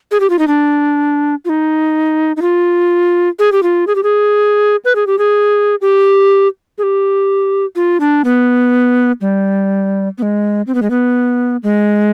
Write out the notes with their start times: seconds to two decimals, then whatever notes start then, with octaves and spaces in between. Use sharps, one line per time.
0.11 G#4
0.20 G4
0.30 F4
0.39 D#4
0.47 D4
1.45 F4
1.49 D#4
2.37 D#4
2.42 F4
3.39 G#4
3.52 G4
3.63 F4
3.87 G#4
3.95 G4
4.03 G#4
4.85 B4
4.95 G#4
5.07 G4
5.19 G#4
5.81 G4
6.78 G#4
6.83 G4
7.76 F4
8.00 D4
8.25 B3
9.21 G3
10.18 B3
10.22 G#3
10.67 C4
10.75 B3
10.82 G#3
10.90 B3
11.63 G#3